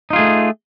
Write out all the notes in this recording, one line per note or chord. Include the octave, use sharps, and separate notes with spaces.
A3 D#4 F4 G#4